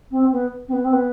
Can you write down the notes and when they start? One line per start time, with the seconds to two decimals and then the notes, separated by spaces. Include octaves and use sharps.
0.11 C4
0.31 B3
0.68 C4
0.72 B3
0.84 C4
0.93 B3